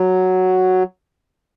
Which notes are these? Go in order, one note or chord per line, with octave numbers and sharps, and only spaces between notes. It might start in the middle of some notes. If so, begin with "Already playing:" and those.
Already playing: F#3